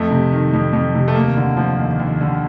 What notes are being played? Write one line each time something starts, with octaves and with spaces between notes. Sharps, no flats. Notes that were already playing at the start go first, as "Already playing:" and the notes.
Already playing: F2 A3
C3
D#3
F2
F2
C3
A3
D#2 A#3
D3
F3
D#2
D#2
D3